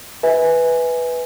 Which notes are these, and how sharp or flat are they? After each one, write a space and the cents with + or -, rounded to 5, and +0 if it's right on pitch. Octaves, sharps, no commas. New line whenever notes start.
B4 +0 E5 -35 G#5 +0